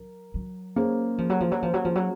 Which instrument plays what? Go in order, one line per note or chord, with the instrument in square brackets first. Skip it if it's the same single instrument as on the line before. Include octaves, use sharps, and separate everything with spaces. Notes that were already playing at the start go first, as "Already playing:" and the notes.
Already playing: [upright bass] F#3 [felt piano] A#4
[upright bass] F#3
[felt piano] A#3 C#4 G#4 C5
[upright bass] F3
F#3
F3
F#3
F3
F#3
F3
F#3